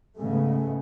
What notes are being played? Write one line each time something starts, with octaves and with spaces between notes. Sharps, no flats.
G#2 C#3 G#3 A3 B3